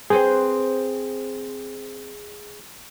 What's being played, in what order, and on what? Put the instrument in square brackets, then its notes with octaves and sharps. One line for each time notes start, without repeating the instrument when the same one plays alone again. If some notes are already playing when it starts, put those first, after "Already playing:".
[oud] C4 B4 C5 [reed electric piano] G#4